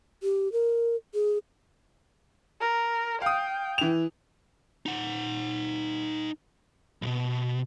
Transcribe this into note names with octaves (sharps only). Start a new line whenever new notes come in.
G4
A#4
G#4
A#4
F5 G5 D#6
E3 F7
D#4 F#5
B1 B2